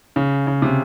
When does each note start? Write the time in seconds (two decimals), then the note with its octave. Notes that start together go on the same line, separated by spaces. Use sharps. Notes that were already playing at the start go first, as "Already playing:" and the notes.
0.16 C#3
0.47 C#3
0.62 C3